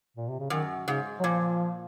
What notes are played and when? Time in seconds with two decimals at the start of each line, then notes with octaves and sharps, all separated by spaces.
0.17 A#2
0.28 C3
0.39 C#3
0.50 F#2 D#3
0.88 G#2 C#3
1.20 F#3
1.24 A#2 F3